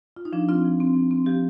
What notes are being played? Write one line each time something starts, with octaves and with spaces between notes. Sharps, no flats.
F4
D#4
F3 D4
C4 F4
F3
C4
F3
C4
F3 G4